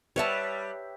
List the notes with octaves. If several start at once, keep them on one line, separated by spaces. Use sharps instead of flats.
G3 B4 C#5 E5 F#5 A5